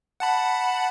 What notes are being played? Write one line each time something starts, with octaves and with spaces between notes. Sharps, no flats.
F#5 A5 B5